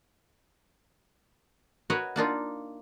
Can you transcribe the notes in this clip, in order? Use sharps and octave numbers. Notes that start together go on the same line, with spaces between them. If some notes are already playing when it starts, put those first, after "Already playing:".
F#4 A#4 B4 C#5 D#5
A#3 D4 D#4 F4